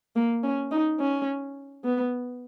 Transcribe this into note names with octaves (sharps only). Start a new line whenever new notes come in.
A#3
C#4
D#4
C#4
B3